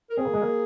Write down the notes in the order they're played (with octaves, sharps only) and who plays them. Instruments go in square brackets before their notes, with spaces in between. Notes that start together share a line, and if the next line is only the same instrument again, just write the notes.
[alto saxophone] A#4
[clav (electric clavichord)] C4 [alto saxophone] G#4
[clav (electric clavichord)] A#3
G#3
A#3